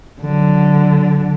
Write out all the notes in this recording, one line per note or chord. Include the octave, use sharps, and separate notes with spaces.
D3 F#3